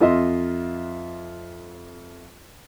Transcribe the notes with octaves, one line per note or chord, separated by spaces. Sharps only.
F2 F4 D#5 E5 C6